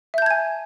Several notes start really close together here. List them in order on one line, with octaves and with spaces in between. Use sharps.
E5 G6 A5 G#6 G#5